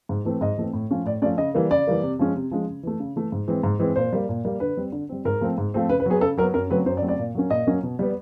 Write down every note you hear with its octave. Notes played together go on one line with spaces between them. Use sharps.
G#2
E3 A3 C4
G#2 D#5
E3 A3 C4
A2
F3 A3 C#4
A2 D5
F3 A3 C#4 D5
C#3 D#5
E3 G3 A#3
C#3 D5
E3 G3 A#3
C3
F3 G#3 C#4
C3
F3 G#3 C#4
C#3
E3 A3
C#3
E3 A3
G#2
E3 G#3 C4
G#2
E3 G#3 C4
A#2 C5
G3 A#3
A#2
G3 A#3
D3 B4
G3 C4
D3
G3 C4
G#2 A#4
F3 A3 C4
G#2
F3 A3 C4
C#3 B4
B4
F#3 B3 G#4
C#3 A4
F#3 A#4
B3
F#2 A#4
C#3 F#3 A3 C4 B4
F#2 C5
D5
C#3 F#3 A3 C4
D5
A#2
F#3 A#3 C#4
A#2 D#5
F#3 A#3 C#4
B2
G3 B3